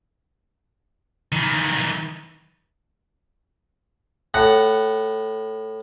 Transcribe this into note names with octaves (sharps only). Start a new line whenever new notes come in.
D#3 E3
A2 F#5